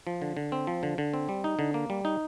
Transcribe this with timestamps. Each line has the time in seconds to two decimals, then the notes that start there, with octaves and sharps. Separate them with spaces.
0.07 F3
0.22 D3
0.37 D3
0.52 C4
0.67 F3
0.83 D3
0.98 D3
1.14 C4
1.29 G3
1.44 D#4
1.59 D3
1.74 A#3
1.90 G3
2.05 D#4